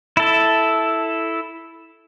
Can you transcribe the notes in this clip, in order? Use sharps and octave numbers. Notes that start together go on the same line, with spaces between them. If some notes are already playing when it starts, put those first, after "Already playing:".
E4 A4